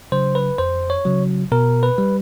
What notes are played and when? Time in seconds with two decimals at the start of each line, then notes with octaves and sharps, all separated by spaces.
0.12 C#3 F#3 C5
0.35 B4
0.58 F2 C5
0.90 C#5
1.05 C#3 F#3
1.52 B2 A#4
1.83 B4
1.98 G3